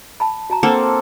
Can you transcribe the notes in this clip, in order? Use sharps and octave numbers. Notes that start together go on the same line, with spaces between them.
A5 B5
F#4 A5 A#5
A#3 C4 D4 A4 F#5 A5